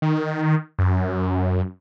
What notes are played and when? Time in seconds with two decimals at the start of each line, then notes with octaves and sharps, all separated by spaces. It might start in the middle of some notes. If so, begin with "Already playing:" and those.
0.02 D#3
0.78 F#2